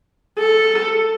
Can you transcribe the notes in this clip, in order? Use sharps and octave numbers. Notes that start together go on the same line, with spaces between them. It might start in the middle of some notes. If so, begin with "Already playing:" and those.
A4